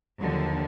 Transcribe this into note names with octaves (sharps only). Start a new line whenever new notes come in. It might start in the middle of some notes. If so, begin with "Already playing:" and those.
D#2 D3 F3 F#3